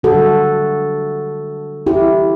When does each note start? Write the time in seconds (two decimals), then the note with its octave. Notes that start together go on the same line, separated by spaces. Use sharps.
0.03 D3 G3 D4 F#4 A4
1.86 E4 G4